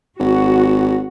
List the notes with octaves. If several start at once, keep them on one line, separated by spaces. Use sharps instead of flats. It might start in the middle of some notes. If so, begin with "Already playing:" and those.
G#1 F#4